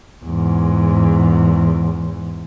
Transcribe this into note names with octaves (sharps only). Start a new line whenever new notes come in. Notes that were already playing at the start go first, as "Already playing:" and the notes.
E2 G#2